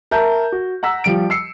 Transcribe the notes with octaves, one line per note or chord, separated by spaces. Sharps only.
A#4 E5 A5 G6
F#4
F#5 A#5 E6 B6
F3 G3 D7
E6 C7 C#7